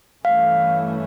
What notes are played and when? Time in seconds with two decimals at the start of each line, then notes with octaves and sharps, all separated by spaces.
0.25 G2 E3 A3 C#4 F5